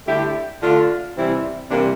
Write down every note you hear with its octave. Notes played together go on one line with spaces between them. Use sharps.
D3 A3 E4 G4
D3 A3 D4 F4
C3 E3 G3 C4 E4
C3 E3 G3 A#3 D4